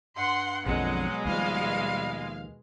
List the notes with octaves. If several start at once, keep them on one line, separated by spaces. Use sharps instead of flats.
G2 F#5 C6
A#1 F2 B2 D3 F#3 G#3 F#5
D#2 F3 G3 F5